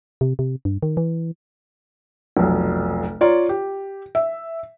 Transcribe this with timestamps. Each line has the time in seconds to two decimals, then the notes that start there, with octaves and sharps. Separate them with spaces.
0.21 C3
0.39 C3
0.65 G2
0.83 D#3
0.97 E3
2.37 F1 B1
3.21 F4 C#5 D5 A#5
3.49 G4
4.15 E5